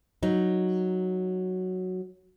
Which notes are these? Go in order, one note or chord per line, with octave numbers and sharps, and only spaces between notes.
F#3 D#4